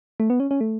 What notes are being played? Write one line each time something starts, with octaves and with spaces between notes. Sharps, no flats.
A3
B3
C#4
C#4
A3